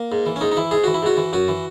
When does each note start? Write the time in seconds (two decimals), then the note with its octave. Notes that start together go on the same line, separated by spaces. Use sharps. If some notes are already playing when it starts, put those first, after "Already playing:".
Already playing: A#3
0.12 G#2
0.26 E3
0.36 C#4
0.41 G#2 D#4
0.52 D#4
0.57 E3 E4
0.71 G#2 G#4
0.84 E3 F#4
0.94 E4
1.03 G#2 F#4
1.17 E3
1.33 F#2 F#4
1.48 E3